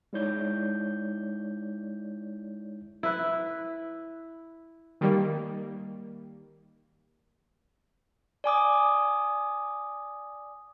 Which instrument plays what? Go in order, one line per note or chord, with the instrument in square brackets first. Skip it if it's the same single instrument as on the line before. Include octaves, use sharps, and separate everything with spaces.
[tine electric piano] G#3 D#4 E4 C#5 D5 G6
[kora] E4 B4
[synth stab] D#3 G3 A#3
[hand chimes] D5 G#5 D6 D#6